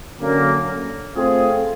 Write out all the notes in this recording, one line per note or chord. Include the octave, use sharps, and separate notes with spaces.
D3 F#3 A#3 C#4
A3 C4 F4 G#4